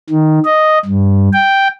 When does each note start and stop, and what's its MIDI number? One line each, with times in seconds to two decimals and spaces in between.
0.10 0.40 51
0.45 0.79 75
0.85 1.29 43
1.33 1.68 79